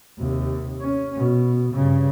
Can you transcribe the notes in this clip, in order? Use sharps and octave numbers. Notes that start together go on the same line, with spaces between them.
D#2 C3
C#4
B2
G2 C#3